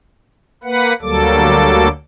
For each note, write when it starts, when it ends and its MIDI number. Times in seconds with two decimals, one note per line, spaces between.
0.64 0.93 58
0.64 0.93 71
0.64 0.93 78
1.02 1.88 38
1.02 1.88 54
1.02 1.88 55
1.02 1.88 58
1.02 1.88 69
1.02 1.88 86